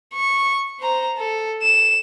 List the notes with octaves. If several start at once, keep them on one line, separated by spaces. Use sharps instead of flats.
C#6
C5 A#5
A4
E7